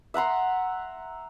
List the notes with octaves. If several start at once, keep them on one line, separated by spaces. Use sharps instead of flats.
E5 F#5 A#5 C6